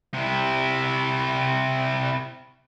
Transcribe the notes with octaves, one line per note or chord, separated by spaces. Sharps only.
C3 E4